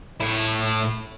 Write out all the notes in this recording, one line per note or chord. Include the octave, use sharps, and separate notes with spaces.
A2 E4